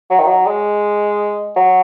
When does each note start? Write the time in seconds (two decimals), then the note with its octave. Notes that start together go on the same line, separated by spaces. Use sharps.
0.10 F#3
0.19 D#3
0.27 F#3
0.47 G#3
1.56 F#3